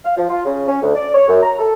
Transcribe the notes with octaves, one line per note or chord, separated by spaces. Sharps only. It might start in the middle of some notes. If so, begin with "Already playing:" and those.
F5
F3
F4
C#3
C#4
D2
D5
C#5
F#2
A#5
A4